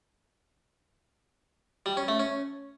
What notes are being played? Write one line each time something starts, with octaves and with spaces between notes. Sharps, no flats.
G3
C#4
A3
C#4